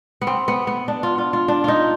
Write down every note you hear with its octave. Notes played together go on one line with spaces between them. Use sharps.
B3
C4
B3
B3
D4
F4
F4
F4
D4
D#4 F4